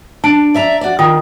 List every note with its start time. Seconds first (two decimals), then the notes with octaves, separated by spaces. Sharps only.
0.24 D4 A5 D7
0.54 D5 E5 A#5
0.81 F#4 D5
0.99 D#3 F4 G5 D#6